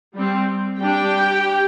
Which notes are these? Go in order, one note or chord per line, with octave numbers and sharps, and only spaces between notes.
G3 C4
G3 D4 G4 G5